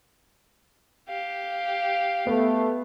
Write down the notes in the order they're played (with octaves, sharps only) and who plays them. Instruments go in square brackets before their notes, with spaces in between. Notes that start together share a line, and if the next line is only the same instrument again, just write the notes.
[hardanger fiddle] G4 F5
[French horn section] A3 [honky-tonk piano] B3